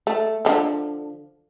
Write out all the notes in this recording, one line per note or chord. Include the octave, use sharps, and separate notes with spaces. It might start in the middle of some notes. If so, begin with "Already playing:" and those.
A3
D3 F3